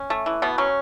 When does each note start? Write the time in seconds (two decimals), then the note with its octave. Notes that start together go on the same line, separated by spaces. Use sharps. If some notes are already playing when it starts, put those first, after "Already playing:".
Already playing: C#4
0.10 A3
0.26 E3
0.42 B2 B3
0.58 F#3 C#4